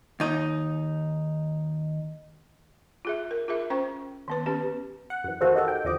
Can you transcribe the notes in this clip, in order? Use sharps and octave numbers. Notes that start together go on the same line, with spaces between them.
D#2 D#4
F4 G#4 E5
A#4
F4 G#4 A#4 E5
C#4 C5 G5 C#6
D#3 B3 B4
B3 C#4 G4 B4
F#5
F#2 E3
D#3 E3 A#3 F#4 A4 C5
A#3 D#4 F#4 G4 A4
G5
D#2 D3 F3 D#5 D6